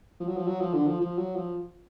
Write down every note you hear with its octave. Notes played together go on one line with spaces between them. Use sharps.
F3
F#3
F3
F#3
F3
D3
F3
F3
F#3
F3